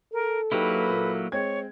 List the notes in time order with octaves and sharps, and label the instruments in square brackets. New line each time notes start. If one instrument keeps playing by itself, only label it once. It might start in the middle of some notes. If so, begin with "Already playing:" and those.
[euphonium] A4 [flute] A#4
[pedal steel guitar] F#3 A#3 E4 [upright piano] D#4 G4 [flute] B4
[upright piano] A#2
[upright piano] G#3 C4 G#6 [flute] C#5